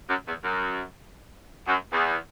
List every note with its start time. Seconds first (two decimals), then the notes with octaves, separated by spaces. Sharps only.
0.09 F#2
0.27 E2
0.44 F#2
1.66 F#2
1.92 E2